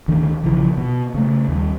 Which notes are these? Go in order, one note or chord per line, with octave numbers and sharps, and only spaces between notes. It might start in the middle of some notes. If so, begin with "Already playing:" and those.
D2 D#3 D4
A#1 C#3 E3 F3
B2
C#3 A3
D#2 G3